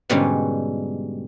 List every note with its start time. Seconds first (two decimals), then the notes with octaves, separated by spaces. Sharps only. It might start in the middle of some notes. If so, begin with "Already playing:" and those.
0.09 G#2 B2 D3 G3 C#4 D#4